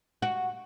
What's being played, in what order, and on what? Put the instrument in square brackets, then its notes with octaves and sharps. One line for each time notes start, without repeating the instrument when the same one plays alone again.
[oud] F#4